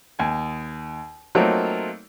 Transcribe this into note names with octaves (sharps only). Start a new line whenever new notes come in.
D#2 G#5
F#3 A3 A#3 C4 D#4 F4